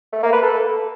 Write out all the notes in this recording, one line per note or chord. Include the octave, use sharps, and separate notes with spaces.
A3
A#3
B4
A4